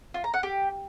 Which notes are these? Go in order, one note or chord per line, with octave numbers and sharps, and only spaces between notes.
F4
A#5
F#5
G4